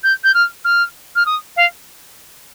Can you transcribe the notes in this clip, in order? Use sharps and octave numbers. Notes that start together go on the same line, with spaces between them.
G6
G6
F6
F6
F6
D#6
F5